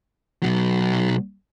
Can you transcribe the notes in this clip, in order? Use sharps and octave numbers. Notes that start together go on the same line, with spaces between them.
B1 F#3